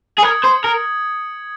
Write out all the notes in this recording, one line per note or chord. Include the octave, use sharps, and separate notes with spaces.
G#4
A#4 D#6 G#6 C#7
C5
A#4